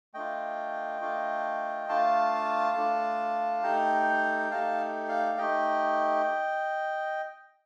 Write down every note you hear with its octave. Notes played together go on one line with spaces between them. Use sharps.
A3 D4 F4 D#5 G5
A3 D4 F4
A3 D4 F4 F5 A5
A3 D4 F4
A3 D#4 G4 G5 A#5
A3 D#4 G4 F5 A5
D5 F5
A3 D#4 G4 D#5 G5